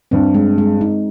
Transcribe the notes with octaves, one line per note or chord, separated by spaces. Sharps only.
G2 C4
G#3
G#3
D#4